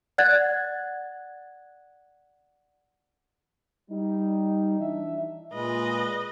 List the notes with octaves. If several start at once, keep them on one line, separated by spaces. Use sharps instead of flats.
D5 F#5 F#6 G#6 A6
G3 D#4
E3 D4 D#4 E5
A#2 G#3 B4 D#5